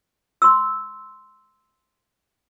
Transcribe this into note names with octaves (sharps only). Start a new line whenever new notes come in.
C6 E6